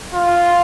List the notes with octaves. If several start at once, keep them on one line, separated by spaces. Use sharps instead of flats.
F4